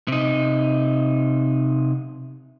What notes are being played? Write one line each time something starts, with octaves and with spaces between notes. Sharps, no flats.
C3 D#4